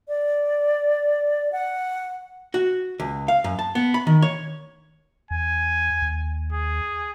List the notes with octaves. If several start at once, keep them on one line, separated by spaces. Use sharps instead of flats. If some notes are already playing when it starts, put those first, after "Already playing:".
D5
F#5
F#4
C#2
F5
F#2
A5
B3
B5
D#3
C#5
E2 G#5
D#2
G#4